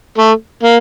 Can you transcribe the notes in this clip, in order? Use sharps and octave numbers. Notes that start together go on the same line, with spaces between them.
A3
A#3